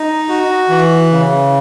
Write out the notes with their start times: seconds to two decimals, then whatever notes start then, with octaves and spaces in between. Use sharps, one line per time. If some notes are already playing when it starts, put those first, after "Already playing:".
Already playing: D#4
0.29 F#4
0.69 E3
1.11 C#3